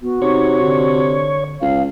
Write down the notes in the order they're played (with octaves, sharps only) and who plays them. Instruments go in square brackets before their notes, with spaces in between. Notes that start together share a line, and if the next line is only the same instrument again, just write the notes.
[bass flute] B3 [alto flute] F#4
[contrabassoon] C3 [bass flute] D#4 [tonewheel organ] C#5
[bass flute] D3
[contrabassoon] C#2 [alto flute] F5